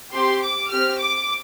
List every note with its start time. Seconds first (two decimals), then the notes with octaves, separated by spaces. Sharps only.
0.13 C4 G4 C6
0.43 D6
0.71 C4 G4 F6
1.00 D6